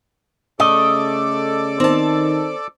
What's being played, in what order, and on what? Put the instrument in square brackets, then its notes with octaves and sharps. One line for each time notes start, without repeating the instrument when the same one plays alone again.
[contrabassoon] C#3 [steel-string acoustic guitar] A3 [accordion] A4 D5 D6 [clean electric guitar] D#5
[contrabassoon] D#3 [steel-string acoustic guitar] C4 A5